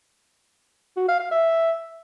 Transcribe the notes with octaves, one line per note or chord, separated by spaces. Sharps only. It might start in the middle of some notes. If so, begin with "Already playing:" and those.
F#4
F5
F5
E5